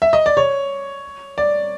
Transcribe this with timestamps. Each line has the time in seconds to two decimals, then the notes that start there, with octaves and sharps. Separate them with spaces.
0.02 E5
0.13 D#5
0.26 D5
0.37 C#5
1.38 D5